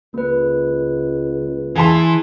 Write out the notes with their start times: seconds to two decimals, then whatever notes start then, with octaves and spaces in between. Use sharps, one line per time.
0.14 C#2 A#3 B4
1.76 E3 G#4 A5 C6